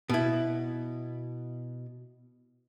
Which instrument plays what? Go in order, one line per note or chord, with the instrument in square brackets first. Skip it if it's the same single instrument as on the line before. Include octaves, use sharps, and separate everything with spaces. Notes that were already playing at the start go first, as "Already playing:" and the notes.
[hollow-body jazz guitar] B2 E4